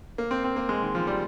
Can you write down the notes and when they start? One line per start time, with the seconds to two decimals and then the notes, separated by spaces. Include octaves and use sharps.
0.18 A#3
0.31 C4
0.44 C4
0.56 A#3
0.69 G#3
0.82 D#3
0.95 F3
1.07 G3